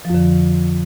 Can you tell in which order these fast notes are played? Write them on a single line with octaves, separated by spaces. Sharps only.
F3 F2 D3